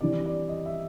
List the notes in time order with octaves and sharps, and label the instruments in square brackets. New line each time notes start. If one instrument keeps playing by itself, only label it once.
[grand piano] C3 E3 G3 D5
D5
D#5
E5